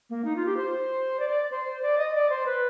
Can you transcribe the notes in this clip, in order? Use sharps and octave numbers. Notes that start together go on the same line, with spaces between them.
A#3
D#4
F4
G4
C5
D5
D5
C5
D5
D#5
D5
C5
B4